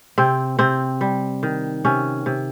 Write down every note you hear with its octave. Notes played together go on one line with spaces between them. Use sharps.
C3 C4
C3 C4
G3
D#3
C3 C#4
C3